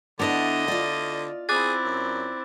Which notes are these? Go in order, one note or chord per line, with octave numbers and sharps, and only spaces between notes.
D3 B3 D4 E4 D#5 F7
F4 D5
C4 E4 G#4 D6 F#6 A6
F#2